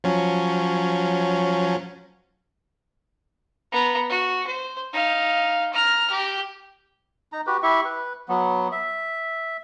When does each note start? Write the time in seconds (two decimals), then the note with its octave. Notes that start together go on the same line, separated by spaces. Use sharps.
0.04 F3 F#3 C#4
3.72 B3 A#5
4.10 F#4
4.47 C5
4.93 D#4 F5
5.73 A#5 F6
6.10 G4
7.33 D#4 A#5
7.47 F#4 G4 B4
7.63 E4 G4 E5 C#6
7.85 B4
8.28 F#3 B3
8.72 E5